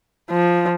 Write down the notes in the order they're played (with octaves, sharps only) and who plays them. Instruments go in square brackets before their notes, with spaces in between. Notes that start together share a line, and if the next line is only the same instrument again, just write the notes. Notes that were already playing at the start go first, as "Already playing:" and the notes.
[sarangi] F3